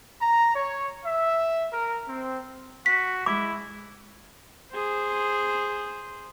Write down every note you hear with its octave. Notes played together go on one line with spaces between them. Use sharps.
A#5
C#5
E5
A#4
C4
F#4 B6
G#3 E4 D6
G#4 C5